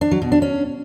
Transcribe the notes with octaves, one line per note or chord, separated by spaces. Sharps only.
D4
F#3
B2
D4
C#4